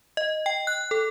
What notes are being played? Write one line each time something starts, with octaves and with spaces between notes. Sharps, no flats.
D#5
G5
F#6
A4